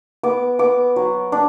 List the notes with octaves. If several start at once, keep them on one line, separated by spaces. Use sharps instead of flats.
B3 D6
B3 D6
F#3
D4